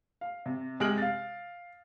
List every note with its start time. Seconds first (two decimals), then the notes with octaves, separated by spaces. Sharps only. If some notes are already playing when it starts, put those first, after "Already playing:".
0.21 F5
0.46 C3
0.80 C3 G#3 G4 F6 D7 F#7
0.98 F5 A6